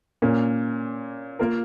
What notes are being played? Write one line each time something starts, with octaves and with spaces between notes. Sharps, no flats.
A#2 A#3 C#4
A#3 F4 A#4